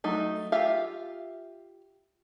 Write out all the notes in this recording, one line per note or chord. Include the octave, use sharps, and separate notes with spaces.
F#3 A3 D#4
F4 G4 E5 F5